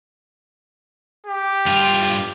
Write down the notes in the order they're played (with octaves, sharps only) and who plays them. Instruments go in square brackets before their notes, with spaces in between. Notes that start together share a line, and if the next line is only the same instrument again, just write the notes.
[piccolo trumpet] G4
[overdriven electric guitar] G2 F4